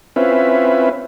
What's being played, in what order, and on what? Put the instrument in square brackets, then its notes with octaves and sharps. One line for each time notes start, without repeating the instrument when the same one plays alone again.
[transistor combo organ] C4 C#4 E4 F4 B4